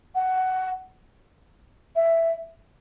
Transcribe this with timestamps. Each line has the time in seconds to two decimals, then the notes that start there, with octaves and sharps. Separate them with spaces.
0.15 F#5
1.96 E5